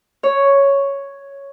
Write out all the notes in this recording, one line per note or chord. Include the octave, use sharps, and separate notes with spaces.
C#5